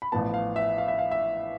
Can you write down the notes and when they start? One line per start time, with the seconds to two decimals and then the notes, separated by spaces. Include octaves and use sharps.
0.02 B5
0.12 A1 A2 F3 B3 A5
0.34 F5
0.56 E5
0.78 F5
0.88 E5
0.99 F5
1.11 E5